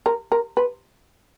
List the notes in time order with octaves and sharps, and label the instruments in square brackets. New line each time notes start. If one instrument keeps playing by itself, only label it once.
[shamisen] A#4
A#4
B4